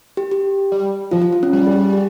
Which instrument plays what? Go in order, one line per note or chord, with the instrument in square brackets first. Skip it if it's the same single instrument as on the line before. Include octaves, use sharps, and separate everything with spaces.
[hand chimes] G4
G4
[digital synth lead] G3
[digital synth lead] F3 [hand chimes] F4
[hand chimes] F4
F4
C#4
[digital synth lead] G3
[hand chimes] G#4
G4
G4